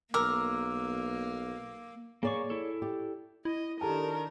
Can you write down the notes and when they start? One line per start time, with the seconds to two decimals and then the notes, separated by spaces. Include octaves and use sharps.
0.14 B1 A#3 A#4 D6 E6
2.23 A#3 G#4 C#5 D5 C#6
2.50 E4 A4
2.82 G4 D5
3.45 E4 D#5
3.81 D#3 D4 G4 A4 A#4 A5